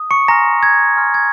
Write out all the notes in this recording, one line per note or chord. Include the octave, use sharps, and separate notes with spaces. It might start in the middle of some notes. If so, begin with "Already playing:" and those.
Already playing: D#6
C#6 C#7
G#5 A#5 C6 F6 A#6
G#6
G#5 C6 F6
G#6